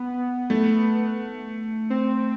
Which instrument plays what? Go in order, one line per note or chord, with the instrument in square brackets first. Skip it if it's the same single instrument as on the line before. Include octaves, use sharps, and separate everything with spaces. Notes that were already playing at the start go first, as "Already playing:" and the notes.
Already playing: [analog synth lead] B3
[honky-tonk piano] A3
[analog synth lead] C4